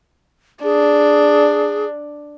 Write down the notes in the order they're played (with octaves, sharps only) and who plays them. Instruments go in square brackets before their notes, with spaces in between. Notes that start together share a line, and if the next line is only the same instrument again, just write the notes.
[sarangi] D4 [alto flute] G#4